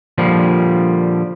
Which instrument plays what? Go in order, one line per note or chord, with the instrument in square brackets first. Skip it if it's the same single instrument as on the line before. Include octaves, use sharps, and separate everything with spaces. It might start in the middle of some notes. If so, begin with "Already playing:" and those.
[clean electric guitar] A#2 D3 F3 G3